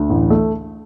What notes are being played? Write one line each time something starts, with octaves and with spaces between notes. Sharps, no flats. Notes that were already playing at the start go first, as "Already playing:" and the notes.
Already playing: D2
A1
A3